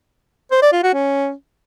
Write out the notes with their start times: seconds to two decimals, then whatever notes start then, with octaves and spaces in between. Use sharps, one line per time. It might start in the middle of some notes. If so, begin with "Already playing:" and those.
0.51 C5
0.62 D5
0.72 F4
0.83 F#4
0.94 C#4